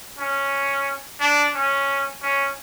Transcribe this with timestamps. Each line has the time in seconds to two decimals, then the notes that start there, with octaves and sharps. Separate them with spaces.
0.19 C#4
1.20 D4
1.55 C#4
2.22 C#4